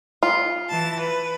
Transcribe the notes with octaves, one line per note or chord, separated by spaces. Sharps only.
F4
E3 A5
B4